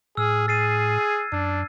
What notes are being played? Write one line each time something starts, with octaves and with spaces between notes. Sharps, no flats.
A2 G#4 E6 F6
G#4 A6 C7 D#7
E6 G#6
F#2 D4